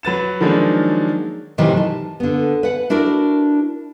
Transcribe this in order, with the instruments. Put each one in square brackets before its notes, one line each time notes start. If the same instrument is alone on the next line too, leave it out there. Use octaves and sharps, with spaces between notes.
[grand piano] F#3 B4 A6 E7
D#3 F3 F#3 G#3 A#3 D4
[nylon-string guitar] A2 C3 D#3 E3 F#3
A5
D3 B3
B4 F#5
D4 E4 F#4 A#4